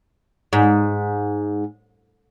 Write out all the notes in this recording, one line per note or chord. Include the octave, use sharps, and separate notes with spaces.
G#2